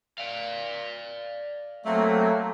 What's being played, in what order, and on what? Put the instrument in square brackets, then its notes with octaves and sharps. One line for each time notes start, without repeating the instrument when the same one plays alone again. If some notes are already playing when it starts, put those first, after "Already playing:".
[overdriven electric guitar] D5 F5
[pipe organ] F#3 A#3 C4 [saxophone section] A3